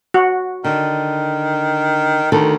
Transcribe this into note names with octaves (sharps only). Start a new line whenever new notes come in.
F#4
D3 D#3
D2 D#3 A4